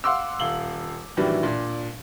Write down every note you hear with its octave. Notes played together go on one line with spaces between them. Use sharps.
F5 F#5 C6 D6 E6
D#1 F5 F#7 G7
A2 D#3 E3 F#3 G3 D4
A#2 D4